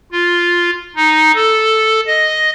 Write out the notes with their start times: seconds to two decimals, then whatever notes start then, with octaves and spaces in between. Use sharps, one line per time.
0.12 F4
0.96 D#4
1.35 A4
2.07 D#5